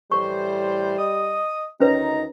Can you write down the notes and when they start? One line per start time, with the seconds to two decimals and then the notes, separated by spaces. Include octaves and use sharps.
0.12 A2 E3 G3 C5 C#6
0.98 D#5 D#6
1.80 D2 D#3 C#4 D#4 B4 C#5 A#5